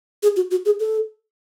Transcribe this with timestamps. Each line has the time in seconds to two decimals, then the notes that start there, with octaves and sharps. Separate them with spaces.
0.23 G#4
0.36 F#4
0.51 F#4
0.66 G#4
0.80 A4